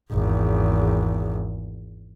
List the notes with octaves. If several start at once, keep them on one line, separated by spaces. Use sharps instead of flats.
G#1 E2